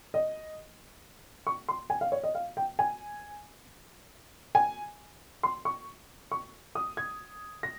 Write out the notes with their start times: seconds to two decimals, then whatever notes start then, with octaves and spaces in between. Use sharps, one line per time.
0.14 D#5
1.47 C#6
1.69 C6
1.90 G#5
2.01 F5
2.12 C#5
2.24 D#5
2.35 F5
2.57 G5
2.79 G#5
4.55 G#5
5.43 C6
5.65 C#6
6.32 C#6
6.75 D#6
6.97 G#6
7.63 A#6